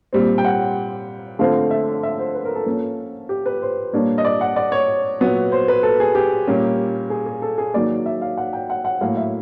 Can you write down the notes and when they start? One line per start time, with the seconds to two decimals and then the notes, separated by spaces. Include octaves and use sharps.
0.13 A#2 G3 C4
0.38 G5
0.45 F#5
1.39 D3 F3 A3 C4 F5
1.71 E5
2.03 E5
2.19 C5
2.35 B4
2.45 A#4
2.55 A4
2.66 F3 A#3 C#4
3.29 G4
3.46 B4
3.62 C5
3.93 A#2 G3 A#3 D4 C#5
4.18 D#5
4.25 D5
4.41 F#5
4.56 D5
4.72 C#5
5.20 A#2 F#3 B3
5.52 C5
5.68 B4
5.83 A4
6.00 G#4
6.15 G4
6.48 A#2 G3 A#3 C#4
7.10 G#4
7.26 G#4
7.42 A4
7.58 G#4
7.74 D#3 F#3 A#3 D5
8.06 E5
8.21 F5
8.37 F#5
8.53 G5
8.70 F#5
8.85 F#5
9.01 A2 F#3 A#3 F5
9.17 E5